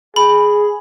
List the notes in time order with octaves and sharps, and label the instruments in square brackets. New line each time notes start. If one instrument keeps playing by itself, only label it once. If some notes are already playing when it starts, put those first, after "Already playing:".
[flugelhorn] G#4 [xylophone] B5